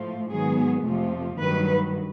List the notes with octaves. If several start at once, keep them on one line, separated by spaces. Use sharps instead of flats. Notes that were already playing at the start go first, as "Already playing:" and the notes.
Already playing: A2 F3 A3
G#2 D#3 F#3 B3 G#4
F2 C3 F3 A3
G2 D#3 F#3 B4